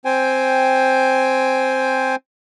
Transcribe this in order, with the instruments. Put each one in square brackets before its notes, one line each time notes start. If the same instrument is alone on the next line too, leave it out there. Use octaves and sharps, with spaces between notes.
[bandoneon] C4 C5 G5 G#5